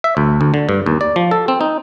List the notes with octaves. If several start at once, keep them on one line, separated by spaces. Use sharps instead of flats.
E5
D2
D2
D3
G2
D#2
D5
F3
A4
C4
D#4